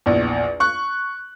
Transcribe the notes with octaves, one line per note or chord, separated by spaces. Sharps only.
A#1 E2
C#6 F#6